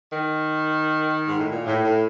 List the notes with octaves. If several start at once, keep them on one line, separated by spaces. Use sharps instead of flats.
D#3
G#2
A2
A#2
A2
A2